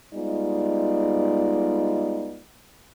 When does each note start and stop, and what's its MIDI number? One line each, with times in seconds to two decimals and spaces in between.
0.14 2.40 55
0.14 2.40 56
0.14 2.40 59
0.14 2.40 63
0.14 2.40 65
0.14 2.40 74